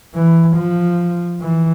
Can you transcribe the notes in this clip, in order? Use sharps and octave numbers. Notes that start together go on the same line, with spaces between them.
E3
F3
E3